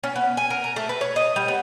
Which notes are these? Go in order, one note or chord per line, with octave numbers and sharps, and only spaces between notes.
C#4
B3
G#5
A#4
A#5
A3
B4
C#5
D#5
G3
B3